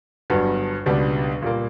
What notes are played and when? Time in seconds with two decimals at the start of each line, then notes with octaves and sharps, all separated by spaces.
0.30 G1 G2 F#3 B3
0.86 C#2 B2 G3 B3 D4
1.42 A#2 G3 A#3